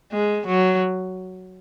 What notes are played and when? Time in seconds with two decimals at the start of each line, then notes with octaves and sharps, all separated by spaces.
0.12 G#3
0.47 F#3